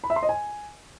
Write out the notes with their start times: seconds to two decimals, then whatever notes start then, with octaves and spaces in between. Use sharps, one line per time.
0.04 B5
0.10 E5
0.16 C6
0.23 D#5
0.29 G#5